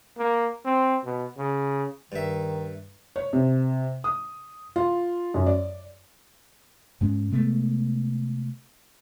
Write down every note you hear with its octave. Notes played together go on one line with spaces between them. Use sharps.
A#3
C4
B2
C#3
G2 D#3 E5
C#5
C3
D#6
F4
F#2
D5
G#2 G#3 C#4
C3 G#3 A3 B3